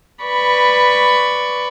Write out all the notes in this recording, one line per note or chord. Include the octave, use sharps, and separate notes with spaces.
B4 D5 B5 C#6